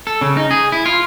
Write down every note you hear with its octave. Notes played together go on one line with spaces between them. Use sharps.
A4
C#3
D#4
G#4
E4
F4